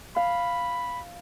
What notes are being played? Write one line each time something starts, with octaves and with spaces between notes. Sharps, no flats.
F5 B5